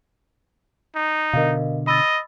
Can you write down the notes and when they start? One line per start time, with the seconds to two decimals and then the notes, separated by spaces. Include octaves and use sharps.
0.96 D#4
1.33 B2 D3 A#4 D#5 F5
1.87 D#5 B5 E6 A6